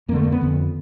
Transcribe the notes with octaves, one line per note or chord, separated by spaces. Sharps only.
F2 D3 A3 A#3
A#3
B3
F2 D3